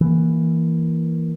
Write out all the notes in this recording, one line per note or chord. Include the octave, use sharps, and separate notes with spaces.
E3 A#3